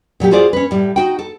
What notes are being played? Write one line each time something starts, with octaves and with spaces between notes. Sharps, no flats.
A#2 F#3 A3 G4
F4 F#4 G#4 C5 D5
C#4 B4
A2 G3
D#4 F#4 G5
A4